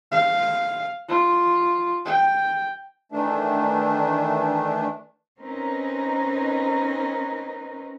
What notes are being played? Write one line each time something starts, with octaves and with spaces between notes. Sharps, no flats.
F5
F4
G5
D#3 E3 A3 D4
C4 C#4 D#4 A#4 B4